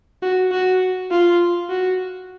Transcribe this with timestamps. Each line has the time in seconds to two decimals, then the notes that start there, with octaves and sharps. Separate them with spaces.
0.22 F#4
0.51 F#4
1.11 F4
1.69 F#4